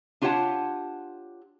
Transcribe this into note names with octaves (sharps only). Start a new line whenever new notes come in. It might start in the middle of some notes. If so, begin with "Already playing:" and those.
D4 F4 G4 C#5 F#5 A5